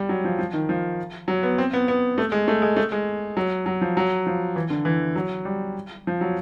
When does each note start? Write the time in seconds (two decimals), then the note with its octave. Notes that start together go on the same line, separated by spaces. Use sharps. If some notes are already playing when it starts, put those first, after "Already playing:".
Already playing: G3
0.09 F#3
0.24 F3
0.38 F3
0.53 D#3
0.69 F3
1.28 F#3
1.43 B3
1.58 C4
1.73 B3
1.88 B3
2.18 A3
2.32 G#3
2.48 A3
2.62 G#3
2.76 A3
2.92 G#3
3.37 F#3
3.66 F#3
3.81 F3
3.97 F#3
4.26 F3
4.56 E3
4.70 D3
4.85 E3
5.16 F#3
5.45 G3
6.07 F3
6.21 F#3